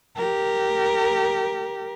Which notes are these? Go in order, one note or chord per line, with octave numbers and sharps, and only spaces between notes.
G4 A#4